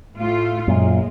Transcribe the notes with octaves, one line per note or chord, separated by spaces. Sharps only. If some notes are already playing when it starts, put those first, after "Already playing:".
A2 A3 F4
F#2 A#2 G#3